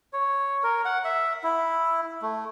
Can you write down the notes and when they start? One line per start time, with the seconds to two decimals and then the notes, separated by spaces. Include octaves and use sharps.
0.13 C#5
0.63 A#4
0.85 F#5
1.05 E5
1.44 E4
2.22 A3